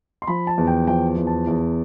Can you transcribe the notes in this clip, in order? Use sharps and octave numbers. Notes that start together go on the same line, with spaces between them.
C6
F3 B5
A5
E2
G5
F3 G5
E2
A5
E2